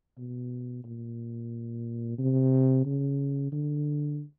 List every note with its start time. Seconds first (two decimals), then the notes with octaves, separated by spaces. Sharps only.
0.18 B2
0.84 A#2
2.18 C3
2.85 C#3
3.52 D3